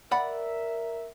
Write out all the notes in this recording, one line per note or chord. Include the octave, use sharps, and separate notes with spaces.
A#4 D5 E5 F#5 B5